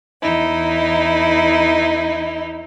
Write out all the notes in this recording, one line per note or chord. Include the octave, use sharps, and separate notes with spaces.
E2 D#4 E4